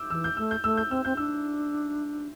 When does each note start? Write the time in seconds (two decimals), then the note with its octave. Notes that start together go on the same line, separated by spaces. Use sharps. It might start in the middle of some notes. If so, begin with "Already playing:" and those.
Already playing: D6 E6 G6
0.10 E3 E6
0.24 G6
0.37 A3 E6
0.51 G6
0.64 A3 E6
0.77 G6
0.90 C4 E6
1.05 C4 G6
1.17 D4 E6